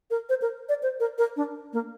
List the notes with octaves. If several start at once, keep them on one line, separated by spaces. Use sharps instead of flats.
A#4
C5
A#4
D5
C5
A#4
A#4
D4
A#3